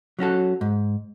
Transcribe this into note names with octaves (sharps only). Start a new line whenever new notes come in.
F#3 C#4 F#4 A4
G#2